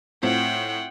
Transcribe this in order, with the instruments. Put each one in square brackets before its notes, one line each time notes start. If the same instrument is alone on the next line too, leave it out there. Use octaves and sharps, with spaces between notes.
[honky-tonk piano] A2 [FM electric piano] C4 F4 [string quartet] F#5 G5 C6